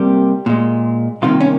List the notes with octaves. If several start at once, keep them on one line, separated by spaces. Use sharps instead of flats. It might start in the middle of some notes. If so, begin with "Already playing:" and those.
Already playing: C2 C3 G3 A#3 G4
A#2 G#3
C2 C3 D#3 A#3 F4
C#4